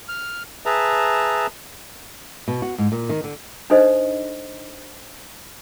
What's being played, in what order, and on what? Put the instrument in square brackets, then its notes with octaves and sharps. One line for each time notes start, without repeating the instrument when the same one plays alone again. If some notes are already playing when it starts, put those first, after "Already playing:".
[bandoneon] F6
G#4 B4 E5 A5 A#5
[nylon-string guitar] B2
F#4
G#2
A#2
D#3
D3
[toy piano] D4 D#4 A4 C5 D#5